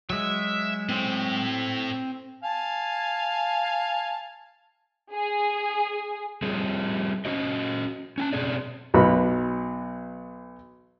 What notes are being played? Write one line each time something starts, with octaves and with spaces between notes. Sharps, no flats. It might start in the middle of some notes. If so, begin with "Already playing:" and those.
F#3 G#3 E5
A2 C4
F5 G#5 A5
G#4
G3 C4 G#4
C#4 F#4 D#5
C#4 G5 A5
B2 C4 G#4 D5
B1 F#3 B5